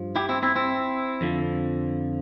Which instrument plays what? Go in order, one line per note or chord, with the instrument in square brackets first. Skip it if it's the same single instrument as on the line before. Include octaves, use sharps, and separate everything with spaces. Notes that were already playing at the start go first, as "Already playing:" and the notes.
Already playing: [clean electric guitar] G2 F3
E4 G4
C4 E4
C4 E4
C4 E4
F2 D3 F3